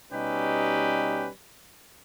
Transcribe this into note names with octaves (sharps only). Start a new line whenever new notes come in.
B2 G3 C#4 D#4 G4 B4